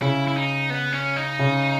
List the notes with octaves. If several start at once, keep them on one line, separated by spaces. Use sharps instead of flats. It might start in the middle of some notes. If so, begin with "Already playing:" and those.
C#3 E4
E4
D#4
B3
C#4
D#4
C#3